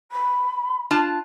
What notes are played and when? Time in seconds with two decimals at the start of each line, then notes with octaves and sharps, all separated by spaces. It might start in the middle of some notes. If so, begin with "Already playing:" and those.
0.11 B5
0.91 D4 F4 A5